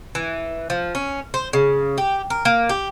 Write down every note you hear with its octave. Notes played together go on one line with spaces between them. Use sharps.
E3
F3
C#4
C5
C#3
G4
A#4
A#3
G4